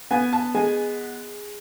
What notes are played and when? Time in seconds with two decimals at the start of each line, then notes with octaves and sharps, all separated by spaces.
0.11 B3 G#5
0.33 A5
0.54 G#3 G#5